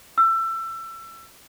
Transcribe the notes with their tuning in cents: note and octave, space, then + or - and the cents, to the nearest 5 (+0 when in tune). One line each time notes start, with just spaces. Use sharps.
E6 +25